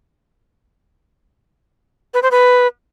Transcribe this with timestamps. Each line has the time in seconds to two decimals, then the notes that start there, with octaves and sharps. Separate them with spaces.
2.14 B4
2.23 C5
2.31 B4